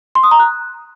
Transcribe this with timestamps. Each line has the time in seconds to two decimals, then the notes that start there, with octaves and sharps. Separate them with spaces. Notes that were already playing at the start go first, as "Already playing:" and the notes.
0.15 C6
0.23 D#6
0.31 A#5
0.39 F#6